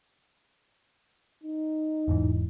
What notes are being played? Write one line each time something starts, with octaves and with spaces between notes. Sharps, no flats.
D#4
E1 G#2 E3